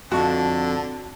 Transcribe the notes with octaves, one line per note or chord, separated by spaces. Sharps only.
F2 D3 F#4 A5